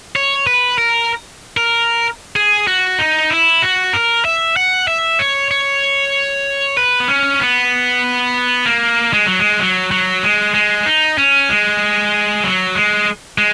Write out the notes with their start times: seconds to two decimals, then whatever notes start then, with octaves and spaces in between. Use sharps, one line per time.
0.16 C#5
0.47 B4
0.78 A#4
1.57 A#4
2.36 G#4
2.67 F#4
2.99 D#4
3.30 E4
3.62 F#4
3.93 A#4
4.25 E5
4.56 F#5
4.88 E5
5.19 C#5
5.51 C#5
6.77 B4
7.00 B3
7.08 C#4
7.40 B3
8.66 A#3
9.13 G#3
9.26 F#3
9.39 G#3
9.60 F#3
9.91 F#3
10.23 G#3
10.54 G#3
10.86 D#4
11.18 C#4
11.49 G#3
12.44 F#3
12.75 G#3
13.38 G#3